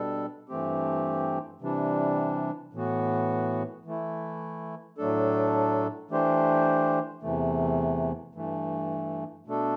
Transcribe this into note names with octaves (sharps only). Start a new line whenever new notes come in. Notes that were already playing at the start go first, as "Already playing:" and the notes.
Already playing: B2 G3 D4 A4
G2 E3 A3 C4 G4
C3 E3 G3 D4
A2 E3 B3 F#4
E3 A3 E4
A2 F#3 A3 D4 A4
E3 A3 D4 G4 C5
E2 C3 E3 A3
G2 E3 A3
B2 A3 D4 A4